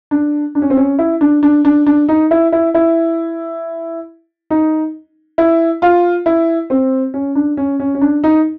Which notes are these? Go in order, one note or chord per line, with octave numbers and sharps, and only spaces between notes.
D4
D4
C#4
C4
C#4
E4
D4
D4
D4
D4
D#4
E4
E4
E4
D#4
E4
F4
E4
C4
C#4
D4
C#4
C#4
C#4
D4
D#4